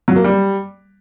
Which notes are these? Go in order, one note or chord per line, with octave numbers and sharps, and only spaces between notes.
F#3
A#3
G3